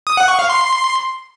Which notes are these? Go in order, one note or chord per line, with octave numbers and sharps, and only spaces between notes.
D#6
F#5
C#6
F5
C6